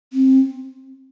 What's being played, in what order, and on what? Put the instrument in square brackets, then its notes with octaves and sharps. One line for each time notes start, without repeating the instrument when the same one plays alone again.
[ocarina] C4